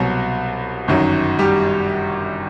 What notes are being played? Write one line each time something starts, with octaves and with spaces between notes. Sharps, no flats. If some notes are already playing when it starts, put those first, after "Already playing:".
Already playing: C2 B2 F#3 F#4
G1 F#2 D#3 F#3
G3 G4